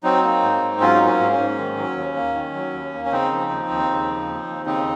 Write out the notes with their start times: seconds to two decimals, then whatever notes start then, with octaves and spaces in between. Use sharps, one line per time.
0.03 F#3 C4 D#4
0.23 A#3
0.43 G#2
0.62 G#2
0.80 F#3 C#4 F4
0.95 D#4
1.00 A#3
1.06 C#4
1.19 G#2
1.32 C#4
1.38 G#2
1.58 D#3
1.78 F#3
1.96 D#2
2.16 A#3
2.35 D#3
2.54 F#3
2.73 D#2
2.93 A#3
3.05 C#4
3.12 C#3 C4 D#4
3.31 F3
3.51 D#2
3.70 D#2
3.90 C#3
4.08 F3
4.27 D#2
4.47 D#2
4.66 C#3 C4 D#4